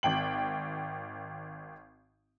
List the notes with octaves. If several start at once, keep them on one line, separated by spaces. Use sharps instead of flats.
G#1 G5 F#7